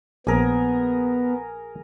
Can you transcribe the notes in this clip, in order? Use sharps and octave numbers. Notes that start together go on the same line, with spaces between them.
A#1 B3 G#4 A#4